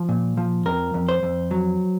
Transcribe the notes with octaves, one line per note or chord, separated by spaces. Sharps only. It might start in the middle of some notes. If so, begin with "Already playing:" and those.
Already playing: F3
A#2
F3
F2 A#4
F2
C5
F2
F#3